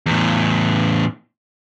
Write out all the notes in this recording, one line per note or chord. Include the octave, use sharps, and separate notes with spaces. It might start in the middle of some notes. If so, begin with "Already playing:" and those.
E2 A2